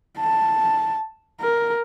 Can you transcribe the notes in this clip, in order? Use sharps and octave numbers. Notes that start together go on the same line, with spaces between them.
A5
A#4